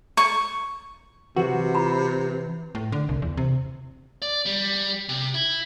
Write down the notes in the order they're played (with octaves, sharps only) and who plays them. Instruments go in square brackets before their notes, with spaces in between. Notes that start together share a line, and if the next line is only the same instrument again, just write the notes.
[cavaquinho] C#6
[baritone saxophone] C3 [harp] E3 [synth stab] F#4
[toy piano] F4 A#5 B5
[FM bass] A2
D3
C2
E2
C3
[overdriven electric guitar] D5
G3
C3
E4